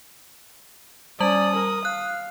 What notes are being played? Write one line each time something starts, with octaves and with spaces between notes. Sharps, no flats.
G3 C#4 D5 A5 D#6 F#7
A#4
F5 F#6